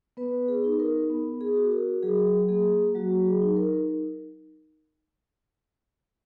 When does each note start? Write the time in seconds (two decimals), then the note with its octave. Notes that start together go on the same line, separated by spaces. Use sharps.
0.17 B3 B4
0.48 G#4
0.64 D#4
0.80 A#4
1.10 B3
1.41 G#4
1.56 F#4
1.71 A#4
2.03 F#3 G#4
2.49 A#3 G#4
2.95 F#3 F#4
3.26 G#4
3.41 D#4
3.56 A#4